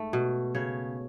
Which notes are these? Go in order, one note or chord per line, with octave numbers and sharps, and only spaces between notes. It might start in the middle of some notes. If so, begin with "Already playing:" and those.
Already playing: G#2 A3
B2
C#3 C#5